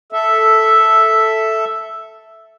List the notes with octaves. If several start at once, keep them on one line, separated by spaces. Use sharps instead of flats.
A4 E5